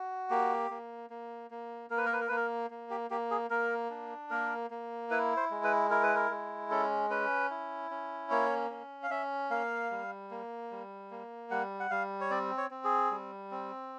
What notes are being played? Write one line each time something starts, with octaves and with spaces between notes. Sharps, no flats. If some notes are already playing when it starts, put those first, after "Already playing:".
Already playing: F#4
A#3 G4
A#3
A#3
A#3
A#3 A#4
B4
A#4
B4
A#4
A#3 B4
A#4
A#3
G4
A#3 G4
G#4
A#3 A#4
D4
A#3 A#4
A#3
E4 B4
C5
G#3
B4
E4 A#4
B4
A#4
G#3
C#4 A4
C#4 B4
E4
C#4
A#3 C#5
C#4
F5
C#4 E5
A#3 F5
G3
A#3
G3
A#3
G3 F#5
F#5
G3 F5
C#5
C4 D5
C#5
C4
G#4
G3
C4